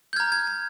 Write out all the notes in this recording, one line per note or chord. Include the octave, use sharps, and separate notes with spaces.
G6
A#5 F6 G#6
G#6
G#6